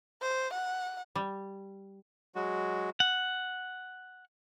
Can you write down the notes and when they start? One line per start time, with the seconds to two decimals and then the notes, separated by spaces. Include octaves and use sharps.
0.22 C5
0.53 F#5
1.15 G3
2.35 F#3 G#3 F#4
3.00 F#5